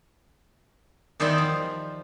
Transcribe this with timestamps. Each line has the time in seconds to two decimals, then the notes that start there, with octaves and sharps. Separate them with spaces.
1.20 E2 D#3 G3 C5 E5 C6
1.38 F3